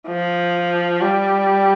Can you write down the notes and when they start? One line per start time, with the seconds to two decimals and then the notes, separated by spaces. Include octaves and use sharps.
0.08 F3
1.02 G3